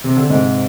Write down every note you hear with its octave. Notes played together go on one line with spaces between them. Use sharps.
C3
D3
G#2 C3